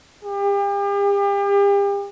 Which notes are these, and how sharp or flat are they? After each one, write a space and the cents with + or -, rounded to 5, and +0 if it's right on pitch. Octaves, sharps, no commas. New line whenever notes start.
G4 +40